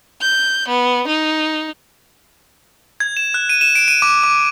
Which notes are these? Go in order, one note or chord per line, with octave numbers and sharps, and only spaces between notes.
G6
B3
D#4
G#6
E7
F#6
D#7
E7
D7
D#7
D6
D6